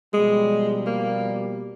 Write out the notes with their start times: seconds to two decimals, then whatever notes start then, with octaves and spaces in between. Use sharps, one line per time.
0.14 B2 F3 G3 G#3
0.87 A#3